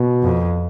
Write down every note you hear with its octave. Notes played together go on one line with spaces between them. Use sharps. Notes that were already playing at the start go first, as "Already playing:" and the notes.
Already playing: B2
F2